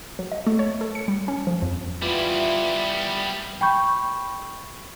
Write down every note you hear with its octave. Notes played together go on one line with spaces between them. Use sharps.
F#3
D#5
A3
C#5
A4
C#7
G3
C#4
F3
F2
E3 G3 B3 F4
G5 B5 C#6 G6